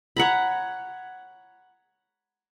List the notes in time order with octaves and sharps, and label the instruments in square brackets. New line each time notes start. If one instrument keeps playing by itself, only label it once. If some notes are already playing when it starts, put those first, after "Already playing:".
[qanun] C#5 F#5 A#5 B5